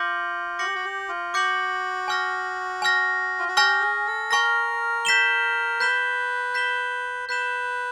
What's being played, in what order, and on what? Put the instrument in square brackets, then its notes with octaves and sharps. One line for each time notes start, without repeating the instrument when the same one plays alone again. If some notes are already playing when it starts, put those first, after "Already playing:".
Already playing: [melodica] F4 [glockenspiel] D6 G6 A#6 C#7 F#7
[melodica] F#4 [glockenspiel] D6 G6 A#6 C#7 F#7
[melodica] G4
F#4
G4
F4
[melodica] F#4 [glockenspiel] D6 G6 A#6 C#7 F#7
[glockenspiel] G#5 C#6 F6 A#6
G#5 C#6 F6 A#6
[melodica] F4
F#4
[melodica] G4 [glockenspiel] G#5 C#6 F6 A#6
[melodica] G#4
A4
[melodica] A#4 [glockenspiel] G#5 C#6 F6 A#6
[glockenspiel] G6 B6 E7 G7
[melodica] B4 [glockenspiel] G6 B6 E7 G7
[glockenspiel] G6 B6 E7 G7
[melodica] B4 [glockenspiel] G6 B6 E7 G7